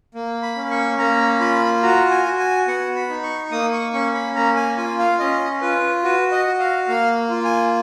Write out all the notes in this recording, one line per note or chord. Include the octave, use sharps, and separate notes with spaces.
A#3
B5
C#4
C#6
A#3 A#5
F4 B5
F#4 A#5
G#5
F#4
G#5
B3 F#5
B5
D#4
C#6
A#3 D#6
C#6
C#4 C#6
B5
A#3 A#5
G#5
F4 G#5
F5
C#4 D#5
F4 B4
F#4 B4
D#5
F#4
F5
A#3 F5
F4
G#5